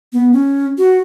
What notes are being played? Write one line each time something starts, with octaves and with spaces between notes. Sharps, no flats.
B3
C#4
F#4